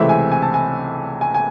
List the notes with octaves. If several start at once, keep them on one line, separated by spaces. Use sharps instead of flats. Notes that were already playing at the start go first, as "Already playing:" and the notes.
Already playing: C#2 C3 E3 A3 C4 E5
G#5
G#5
A5
G#5
G#5
G#5